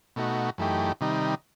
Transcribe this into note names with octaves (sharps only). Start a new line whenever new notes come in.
B2 A3 D#4 F#4
F#2 E3 A3 D#4 G4
C3 D#3 G3 D#4